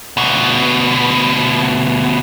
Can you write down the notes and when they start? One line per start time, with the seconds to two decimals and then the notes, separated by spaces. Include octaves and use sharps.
0.17 D2 B2